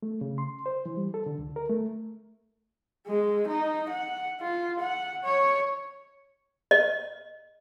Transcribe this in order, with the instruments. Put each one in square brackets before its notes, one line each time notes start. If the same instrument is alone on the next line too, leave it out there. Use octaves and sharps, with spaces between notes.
[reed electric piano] A3
C#3
C6
C5
E3
G3
A4
D3
C#2
A#4
A3
[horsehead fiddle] G#3
D#4
F#5
F4
F#5
C#5
[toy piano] D#5